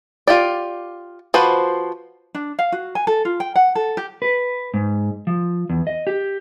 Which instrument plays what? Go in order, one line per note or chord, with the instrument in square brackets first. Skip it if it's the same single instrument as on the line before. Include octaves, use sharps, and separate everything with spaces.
[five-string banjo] F4 G4 D5
F3 F#4 B4 C5
[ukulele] D4
F5
F#4
G#5
A4
F4
G5
F#5
A4
G4
[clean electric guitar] B4
G#2
F3
E2
D#5
G4